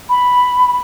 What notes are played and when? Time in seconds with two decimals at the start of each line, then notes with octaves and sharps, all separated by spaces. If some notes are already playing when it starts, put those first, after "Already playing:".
0.09 B5